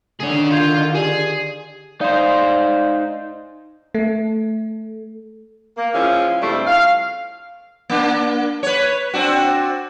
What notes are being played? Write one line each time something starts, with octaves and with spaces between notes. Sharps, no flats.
D3 D#3 G#4 C#5
F4 C6 G6 G#6
G4 G#4 D5
D#4 C5 D5 F5
A3
A#3
F3 G#3 C#4 E4 F4
G2 C#3 G3 A3 C4 E4
F5
A#3 D4
B4 C#5
C4 D4 F#4